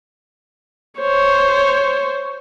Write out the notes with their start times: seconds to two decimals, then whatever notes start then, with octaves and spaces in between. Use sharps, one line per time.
1.00 C5 C#5